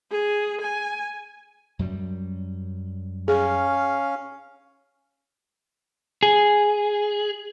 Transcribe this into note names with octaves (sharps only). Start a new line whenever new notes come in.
G#4
G#5
F#2 F#3 G3
C#4 G#4 F5
G#4